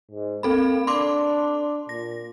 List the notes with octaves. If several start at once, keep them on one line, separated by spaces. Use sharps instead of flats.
G#2
A#3 C4 A4 B5
D4 C6 D6
A#2 A#6